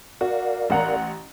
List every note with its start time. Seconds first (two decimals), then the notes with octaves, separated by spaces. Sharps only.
0.21 F#4 A#4 D5 F5
0.70 A1 F#5 A#5